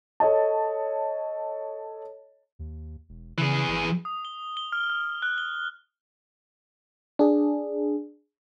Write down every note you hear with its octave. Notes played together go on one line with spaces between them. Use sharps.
A4 C#5 D#5 A5
D#2
E1
C#3 E3 G#4
G#1
D#6
G7
G7
F6
F6
F#6
G7
D4 G#4